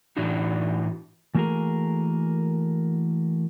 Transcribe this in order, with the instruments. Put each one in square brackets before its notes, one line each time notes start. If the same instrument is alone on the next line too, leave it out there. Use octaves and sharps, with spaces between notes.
[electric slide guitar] A2 E3 D4 D#4 F#4
[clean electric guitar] E3 A3 A#3 F#4 G#4 A#4